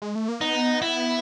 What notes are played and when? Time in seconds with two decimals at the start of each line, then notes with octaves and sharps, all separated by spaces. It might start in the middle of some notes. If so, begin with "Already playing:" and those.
0.02 G#3
0.15 A3
0.28 A#3
0.41 B3 D#4
0.82 E4